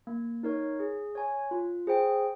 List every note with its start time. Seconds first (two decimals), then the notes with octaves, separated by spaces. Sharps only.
0.07 A#3
0.43 D#4 A#4 C#5
0.80 G#4
1.15 C#5 G#5
1.51 F4
1.87 G#4 C5 G5